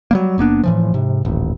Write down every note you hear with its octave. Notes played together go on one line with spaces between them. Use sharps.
F#3 G3 A#3
F#1 A#3 B3 D4
A2 E3 F3
G#2 C3
D#1 A1